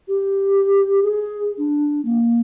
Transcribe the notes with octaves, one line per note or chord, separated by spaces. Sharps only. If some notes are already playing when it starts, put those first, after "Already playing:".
G4
G#4
D4
A#3